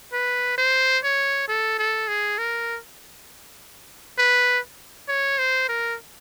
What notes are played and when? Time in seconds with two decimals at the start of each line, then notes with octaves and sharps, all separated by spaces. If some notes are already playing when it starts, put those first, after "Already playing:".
0.13 B4
0.58 C5
1.04 C#5
1.48 A4
1.79 A4
2.08 G#4
2.38 A#4
4.19 B4
5.08 C#5
5.39 C5
5.69 A#4